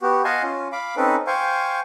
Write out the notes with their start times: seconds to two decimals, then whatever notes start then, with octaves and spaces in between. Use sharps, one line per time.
0.02 B3 F#4 G4
0.24 D#5 F5 F#5 G#5 A5 C6
0.43 C#4 F4
0.72 F5 B5 D6
0.97 C4 C#4 D#4 A4 B4
1.27 C5 F5 G5 G#5 C#6